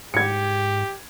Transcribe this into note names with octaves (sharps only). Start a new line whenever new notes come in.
G#2 G4 G#6 C#7